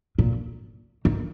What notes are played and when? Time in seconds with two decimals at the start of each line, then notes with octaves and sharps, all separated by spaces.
0.18 A#2
1.05 D#3